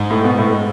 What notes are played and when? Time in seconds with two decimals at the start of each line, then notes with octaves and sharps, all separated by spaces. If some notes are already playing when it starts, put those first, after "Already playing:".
Already playing: G#2
0.10 A2 A3
0.24 B2 B3
0.38 A2 A3
0.53 G#3